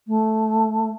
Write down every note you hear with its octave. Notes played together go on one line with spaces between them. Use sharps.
A3